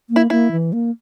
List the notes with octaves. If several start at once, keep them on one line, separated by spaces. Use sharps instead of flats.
A#3
E4
A#3 E4
E3
A#3